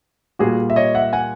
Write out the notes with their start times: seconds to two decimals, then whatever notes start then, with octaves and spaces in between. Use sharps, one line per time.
0.39 A#2 G3 F#4 G#4
0.70 E5
0.76 C#5 D#5
0.95 E5 F#5
1.13 F#5 G#5